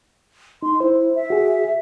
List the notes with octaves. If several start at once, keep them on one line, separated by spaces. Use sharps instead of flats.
D#4 C6
E4 C5
E5
F#4 G#4